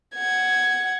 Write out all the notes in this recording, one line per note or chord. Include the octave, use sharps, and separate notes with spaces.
F#5 G#6